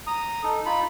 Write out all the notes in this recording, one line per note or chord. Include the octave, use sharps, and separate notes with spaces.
A#5 D#6
D#4 A4
D#4 F4 B5